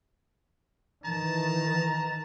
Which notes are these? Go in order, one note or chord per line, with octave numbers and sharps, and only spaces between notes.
D#3 E3 A5 A#5